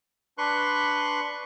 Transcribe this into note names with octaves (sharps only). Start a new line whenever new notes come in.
D4 B4 C6 C#6 F#6